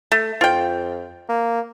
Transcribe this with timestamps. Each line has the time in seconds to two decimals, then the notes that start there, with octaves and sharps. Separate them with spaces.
0.12 A3
0.41 F2 F4 G5
1.29 A#3